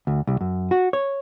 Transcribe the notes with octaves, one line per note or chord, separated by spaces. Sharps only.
D2
C2
F#2
F#4
C#5